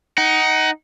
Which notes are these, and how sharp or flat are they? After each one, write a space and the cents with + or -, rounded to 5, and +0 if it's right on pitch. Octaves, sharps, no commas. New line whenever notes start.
D#4 +10 F#5 +25